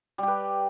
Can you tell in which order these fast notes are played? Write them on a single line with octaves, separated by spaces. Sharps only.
G3 G4 B4